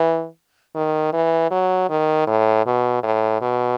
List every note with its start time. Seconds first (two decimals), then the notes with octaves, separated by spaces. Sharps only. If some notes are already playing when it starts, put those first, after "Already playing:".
Already playing: E3
0.75 D#3
1.13 E3
1.51 F#3
1.89 D#3
2.27 A2
2.66 B2
3.03 A2
3.41 B2